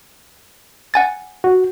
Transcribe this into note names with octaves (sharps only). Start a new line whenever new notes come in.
F#5 G#5 A6
F#4